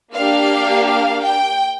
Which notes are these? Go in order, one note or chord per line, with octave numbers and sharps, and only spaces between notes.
A#3 D4 G4 F5
F5
G5